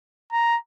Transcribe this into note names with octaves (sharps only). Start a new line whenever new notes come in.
A#5